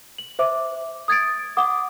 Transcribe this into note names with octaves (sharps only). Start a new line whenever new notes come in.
F#7
C5 E5 D6
D#6 G#6 A6 D7
F#5 D6 D#6